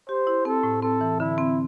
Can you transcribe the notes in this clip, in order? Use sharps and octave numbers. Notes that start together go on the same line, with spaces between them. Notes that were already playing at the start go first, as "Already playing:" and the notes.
G4 C5
E4
C4 A4
A2
C4 A4
E3
D3 E4
C4